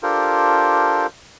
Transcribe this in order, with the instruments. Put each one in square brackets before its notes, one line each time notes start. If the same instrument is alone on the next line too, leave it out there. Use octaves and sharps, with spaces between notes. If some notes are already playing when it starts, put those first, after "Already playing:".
[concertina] D4 F4 G4 A4 A#4 C5